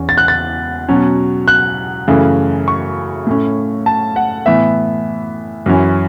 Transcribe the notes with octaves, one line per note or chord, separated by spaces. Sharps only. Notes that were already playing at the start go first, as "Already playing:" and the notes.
Already playing: E2 E3 C#4
A6
F#6
A6
B2 F#3 C#4
F#6
F#2 C#3 E3 A3
C#6
A2 A3 C#4
A5
F#5
A2 E3 B3 E5
F#2 E3 C#4